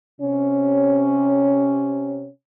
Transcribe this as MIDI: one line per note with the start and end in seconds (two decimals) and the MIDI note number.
0.21 2.28 48
0.21 2.28 61